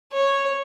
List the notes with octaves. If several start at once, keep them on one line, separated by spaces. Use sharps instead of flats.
C#5